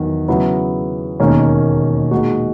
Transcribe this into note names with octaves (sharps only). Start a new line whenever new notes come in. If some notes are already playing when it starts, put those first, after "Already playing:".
Already playing: E2 D#3 F#3
C#3 F#3 B3 E4
E1 D#2 D#3 A#3 C#4
A#2 G#3 D#4 F#4